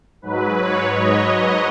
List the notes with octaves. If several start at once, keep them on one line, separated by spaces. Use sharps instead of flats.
G#2 F#3 B4
C#5
D#5